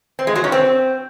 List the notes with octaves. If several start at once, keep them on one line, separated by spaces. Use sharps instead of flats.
C4
G#3
F#3
C#4
C4